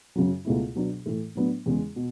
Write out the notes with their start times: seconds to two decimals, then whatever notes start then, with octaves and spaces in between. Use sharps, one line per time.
0.16 F#2 C#3 F#3
0.45 C#2 B2 A3 E4
0.75 B2 F#3 B3 D4
1.06 A2 E3 A3
1.35 A2 F#3 B3 D4
1.66 E2 C#3 G#3
1.96 B2